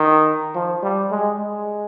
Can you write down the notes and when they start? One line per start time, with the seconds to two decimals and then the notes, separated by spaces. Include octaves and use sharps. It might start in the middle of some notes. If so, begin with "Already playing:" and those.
Already playing: D#3
0.55 F3
0.83 G3
1.11 G#3
1.39 G#3